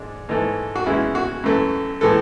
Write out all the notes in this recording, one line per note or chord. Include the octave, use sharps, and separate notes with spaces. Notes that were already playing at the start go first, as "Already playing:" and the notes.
Already playing: G#2 G#3 D4
G#2 E3 A3
F#4
E2 C#3 E3 G#3 E4
F#4
F#2 E3 A3
A2 E3 G#3 A4